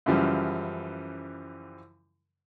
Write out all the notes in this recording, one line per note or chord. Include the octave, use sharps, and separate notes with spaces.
F#2 C#3 E3 F3 G3